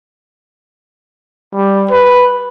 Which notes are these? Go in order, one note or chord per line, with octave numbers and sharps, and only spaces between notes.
G3
B4